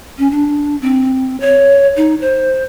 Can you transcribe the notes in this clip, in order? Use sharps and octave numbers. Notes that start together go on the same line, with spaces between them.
C#4
D4
C4
C#5
D#4
C5